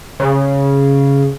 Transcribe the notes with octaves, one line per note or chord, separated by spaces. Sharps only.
C#3